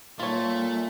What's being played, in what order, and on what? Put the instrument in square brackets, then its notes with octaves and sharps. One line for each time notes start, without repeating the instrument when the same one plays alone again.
[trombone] A#2 [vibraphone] G3 A#3 [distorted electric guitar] A3 [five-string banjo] F4 C#5